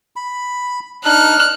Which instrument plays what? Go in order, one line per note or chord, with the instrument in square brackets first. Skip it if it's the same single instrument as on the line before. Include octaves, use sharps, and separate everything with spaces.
[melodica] B5
[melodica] D4 D#4 [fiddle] F6 F#6